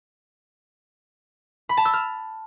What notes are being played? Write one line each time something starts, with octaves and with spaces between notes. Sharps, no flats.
B5
A5
E6
F6